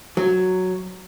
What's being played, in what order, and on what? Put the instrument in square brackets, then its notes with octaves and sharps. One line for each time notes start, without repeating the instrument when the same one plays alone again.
[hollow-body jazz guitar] F#3